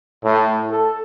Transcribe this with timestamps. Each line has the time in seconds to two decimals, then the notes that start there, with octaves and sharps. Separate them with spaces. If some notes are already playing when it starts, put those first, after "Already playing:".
0.24 A2
0.69 A4